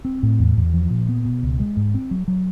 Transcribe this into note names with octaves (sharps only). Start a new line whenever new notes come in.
C4
A2
E2
E2
F3
A#2
B3
B2
C#2
G#3
G#2
C4
F#3
F#3